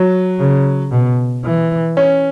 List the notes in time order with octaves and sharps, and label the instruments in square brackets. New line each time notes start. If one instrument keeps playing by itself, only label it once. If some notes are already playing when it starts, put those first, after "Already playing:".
Already playing: [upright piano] F#3
[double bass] C#3
B2
E3
[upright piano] C#4